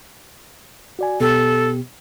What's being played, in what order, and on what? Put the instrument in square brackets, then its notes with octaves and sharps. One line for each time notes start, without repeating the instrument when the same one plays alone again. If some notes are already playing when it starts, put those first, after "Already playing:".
[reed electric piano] F#4 D5 G#5
[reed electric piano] B2 B3 G4 [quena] A4